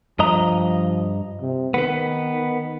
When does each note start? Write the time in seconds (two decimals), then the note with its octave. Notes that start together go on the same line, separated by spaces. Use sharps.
0.19 G2 F3 D#5 A#5
1.41 C3
1.74 D#3 B3 B4